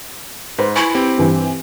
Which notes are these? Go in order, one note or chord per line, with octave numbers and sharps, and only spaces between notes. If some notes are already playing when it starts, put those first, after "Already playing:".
G#2 B4 C5
E4 G#5 C#6
C4 G4
G2 E3